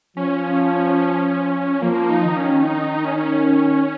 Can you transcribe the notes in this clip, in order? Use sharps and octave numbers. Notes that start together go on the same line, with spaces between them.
F3 C#4
F3 A#3
D#4
D#3
C#4
D#4
C#4